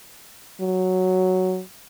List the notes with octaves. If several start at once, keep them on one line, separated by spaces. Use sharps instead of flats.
F#3